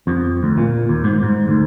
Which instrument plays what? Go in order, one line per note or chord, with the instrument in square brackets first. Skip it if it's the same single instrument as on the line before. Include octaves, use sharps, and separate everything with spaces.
[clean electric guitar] F2
D2
A#2
D#2
G#2
G#2
D2